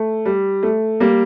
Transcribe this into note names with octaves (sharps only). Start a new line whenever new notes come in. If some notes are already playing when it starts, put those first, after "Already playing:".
Already playing: A3
G3
A3
G3 A#3